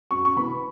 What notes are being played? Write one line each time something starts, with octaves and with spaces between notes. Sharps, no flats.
F#2 C#6
C#6
E3 B3 B5